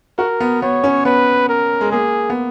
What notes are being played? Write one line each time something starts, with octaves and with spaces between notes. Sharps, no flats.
F#4 A#4
B3
B3 C#5
C#4
B3 B4
A#4
G#3
A#3 G#4
B3